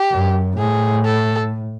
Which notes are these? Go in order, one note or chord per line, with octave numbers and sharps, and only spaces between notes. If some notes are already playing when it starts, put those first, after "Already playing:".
Already playing: G4
F#2
A2 G#4
A4